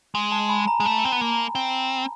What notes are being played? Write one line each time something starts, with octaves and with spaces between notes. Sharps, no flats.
G#3 G#5
A5
B5
A#5
G#3
A3
C4
B3
A#3
C4